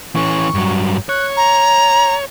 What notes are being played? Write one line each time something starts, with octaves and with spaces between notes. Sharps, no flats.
E3 C#4 C#6
G2 F#3
C#5 F#6
A#5